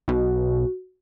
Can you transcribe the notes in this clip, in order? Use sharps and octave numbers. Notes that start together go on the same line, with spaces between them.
B1 B2 F#4